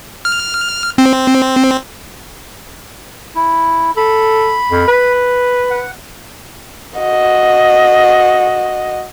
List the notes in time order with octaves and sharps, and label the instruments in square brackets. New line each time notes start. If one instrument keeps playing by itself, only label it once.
[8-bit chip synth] F6
C4
[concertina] E4
[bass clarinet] A4 [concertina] B5
[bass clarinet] F2
B4
[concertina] F#5
[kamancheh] F#4 D#5